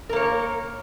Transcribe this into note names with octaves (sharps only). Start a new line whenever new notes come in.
A#3 A#4 C#5